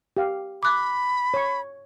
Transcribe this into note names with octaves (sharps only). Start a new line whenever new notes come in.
G4 F5
B5 D6 F#6
C#5 C#6